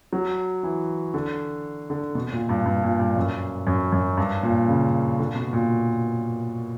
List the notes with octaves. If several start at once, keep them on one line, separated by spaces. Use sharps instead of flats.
F#3
E3
D3
D3
B2
A#2
G2
G2
A#2
G2
F#2
F#2
F#2
G2
A#2
C#3
D3
B2
A#2